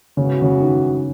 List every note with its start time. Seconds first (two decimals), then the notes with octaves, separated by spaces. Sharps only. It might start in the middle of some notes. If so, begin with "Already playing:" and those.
0.17 G#2 C#3 E3 B3 F#4
0.42 C#3
0.61 D#3